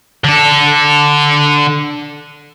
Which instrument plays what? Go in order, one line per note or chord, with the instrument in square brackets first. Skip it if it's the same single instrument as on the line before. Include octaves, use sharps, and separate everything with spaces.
[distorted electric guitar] D3 A4